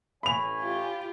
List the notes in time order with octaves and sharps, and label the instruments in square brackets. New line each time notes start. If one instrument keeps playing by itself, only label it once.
[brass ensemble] A1 C#5 G#5 [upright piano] B5 F7
[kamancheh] F4 G4